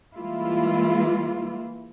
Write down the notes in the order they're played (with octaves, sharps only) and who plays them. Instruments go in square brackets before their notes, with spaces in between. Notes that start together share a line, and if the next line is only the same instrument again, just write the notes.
[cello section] E3 G3 G#3 A#3 E4 F4